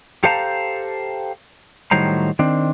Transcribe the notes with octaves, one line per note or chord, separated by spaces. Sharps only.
G4 A4 C5 F5 A5 A#5
A2 D#3 F#3 G3 C5 A#5
D#3 C4 D4